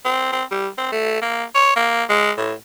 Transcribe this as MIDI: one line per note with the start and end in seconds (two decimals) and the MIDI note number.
0.05 0.31 60
0.32 0.44 60
0.51 0.68 55
0.78 0.89 60
0.92 1.22 57
1.22 1.44 58
1.55 1.76 73
1.76 2.04 58
2.09 2.32 56
2.38 2.53 45